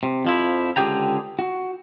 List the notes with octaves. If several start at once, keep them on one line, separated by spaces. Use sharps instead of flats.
C3
F2 F3 E4
C#2 D3 G4 G#4 G5 A#5
F#4